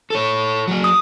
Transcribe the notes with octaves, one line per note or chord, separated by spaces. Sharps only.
A4 C#5
F#3 G#4
D#6